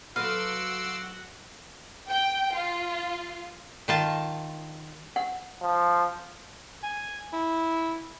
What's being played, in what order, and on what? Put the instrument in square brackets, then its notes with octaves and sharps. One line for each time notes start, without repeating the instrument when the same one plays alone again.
[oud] F#3 A4 B4 [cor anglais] F#4 [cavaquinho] F5 [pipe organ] C6 D6 E6
[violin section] G5
F4
[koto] D#3 F4 A5
[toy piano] F#5
[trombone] F3
[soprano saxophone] G#5
E4